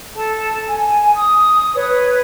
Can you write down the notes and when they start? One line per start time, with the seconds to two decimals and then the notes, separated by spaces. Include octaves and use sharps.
0.14 A4 A5
0.65 G#5
1.15 D#6
1.74 B4 C#5